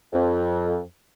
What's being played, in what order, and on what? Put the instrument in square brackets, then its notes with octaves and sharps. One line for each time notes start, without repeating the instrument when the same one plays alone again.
[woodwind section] F2